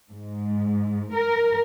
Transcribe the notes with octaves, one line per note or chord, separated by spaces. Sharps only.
G#2
A#4